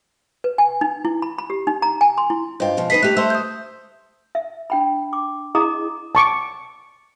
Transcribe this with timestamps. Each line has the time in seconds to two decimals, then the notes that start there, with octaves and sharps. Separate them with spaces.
0.44 B4
0.58 G#5
0.81 D#4
1.05 E4
1.22 B5
1.39 B5
1.50 G4
1.67 D#4
1.82 A#5
2.01 G#5
2.18 C6
2.30 E4
2.60 G2 F4 C5 D#5 G5
2.77 B2 F3
2.90 D#4 B4 D#5 B6 C7 D#7
3.03 A3 G4 F#6 F7
3.17 A3 C5 E5 A5 C6 E6
3.30 D#6 G6
4.35 E5
4.70 D4 G5 B5
5.13 D6
5.55 E4 G#4 D#5 A#5 D6 D#6
6.15 A5 C#6 D6